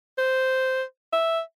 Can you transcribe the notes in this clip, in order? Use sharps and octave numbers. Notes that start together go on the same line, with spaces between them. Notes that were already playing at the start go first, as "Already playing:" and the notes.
C5
E5